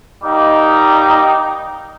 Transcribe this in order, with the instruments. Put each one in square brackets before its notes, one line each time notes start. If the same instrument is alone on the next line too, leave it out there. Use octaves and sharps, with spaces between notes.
[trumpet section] G3 A#3 D#4 G4 D6